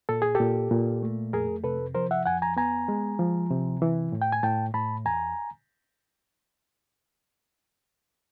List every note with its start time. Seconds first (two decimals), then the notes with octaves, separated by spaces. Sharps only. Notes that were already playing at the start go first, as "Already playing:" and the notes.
0.09 A#2 A4
0.22 G#4
0.35 G4 A4
0.40 A#2
0.71 A#2
1.03 A3
1.33 F2 G#4 A#4
1.64 C3 A4 B4
1.95 F3 A#4 C5
2.11 E5 F#5
2.26 F2 F#5 G#5
2.42 G#5 A#5
2.57 B3 G#5 A#5
2.88 G#3
3.19 F3
3.51 C3
3.82 E3
4.12 A2
4.22 G5
4.33 G#5
4.43 A2 G5 A5
4.74 A2 A5 B5
5.05 E2 G#5 A#5